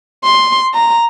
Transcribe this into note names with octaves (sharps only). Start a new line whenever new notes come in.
C6
A#5